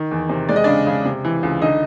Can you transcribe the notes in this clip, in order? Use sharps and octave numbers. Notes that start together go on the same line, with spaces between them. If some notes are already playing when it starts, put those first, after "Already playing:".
Already playing: D#3
E2
C3
G#3 D5
D#5
C#3 D4 D5
C#3
C3
E3
C#2
D3 D#4 D#5